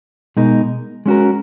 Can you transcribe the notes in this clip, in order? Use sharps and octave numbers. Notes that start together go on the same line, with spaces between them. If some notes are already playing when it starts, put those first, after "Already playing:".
B2 G#3 D#4 A#4
G#3 C#4 F#4 A#4